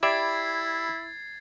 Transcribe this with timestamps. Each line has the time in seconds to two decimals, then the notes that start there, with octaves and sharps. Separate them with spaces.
0.03 E4 G4 D5 E5 B5 G#6 A6 C7